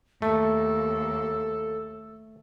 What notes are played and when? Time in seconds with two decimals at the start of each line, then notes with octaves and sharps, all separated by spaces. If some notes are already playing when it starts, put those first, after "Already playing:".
0.22 D#2 A3 A4